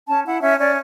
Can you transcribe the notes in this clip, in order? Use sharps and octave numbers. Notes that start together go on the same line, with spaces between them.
C#4 A5
E4 F#5
C#4 E5
C#4 D5